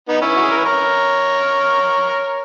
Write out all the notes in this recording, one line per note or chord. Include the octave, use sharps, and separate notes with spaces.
B3 D#4
C#4 E4
F#4
G#4
A#4
B4
A#4 C#5